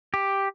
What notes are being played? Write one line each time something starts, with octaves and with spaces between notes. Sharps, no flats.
G4